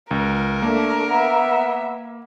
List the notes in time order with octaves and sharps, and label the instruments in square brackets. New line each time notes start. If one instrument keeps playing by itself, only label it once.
[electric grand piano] C#2 [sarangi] A#4
[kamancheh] A3 D4 [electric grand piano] A#3
[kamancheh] B3 E5